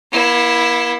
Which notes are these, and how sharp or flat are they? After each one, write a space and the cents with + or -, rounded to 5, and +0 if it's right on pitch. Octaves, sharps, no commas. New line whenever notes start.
A#3 +45 E4 +0